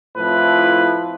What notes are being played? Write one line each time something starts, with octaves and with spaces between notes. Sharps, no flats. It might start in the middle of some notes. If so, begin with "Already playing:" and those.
F2 A2 F3 E4 B4